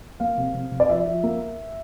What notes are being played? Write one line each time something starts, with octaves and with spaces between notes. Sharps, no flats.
A#3 F5
C3
C3
C3
D5
F3 E5
F3
A#3